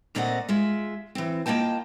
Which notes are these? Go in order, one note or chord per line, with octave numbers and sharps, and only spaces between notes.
A#2 A3 C4 D5 D#5 F#5
G#3 F4 E5
E3 C4
A#3 F4 D#5 G5 A5